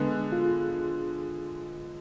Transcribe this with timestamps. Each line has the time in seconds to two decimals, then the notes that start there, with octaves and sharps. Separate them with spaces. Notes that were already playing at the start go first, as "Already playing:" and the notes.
Already playing: D3 G#3 B3 G#4
0.32 F4